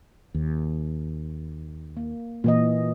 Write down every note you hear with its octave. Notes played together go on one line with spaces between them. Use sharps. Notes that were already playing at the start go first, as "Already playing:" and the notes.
D#2
A#3
A#2 E3 A#3 D#5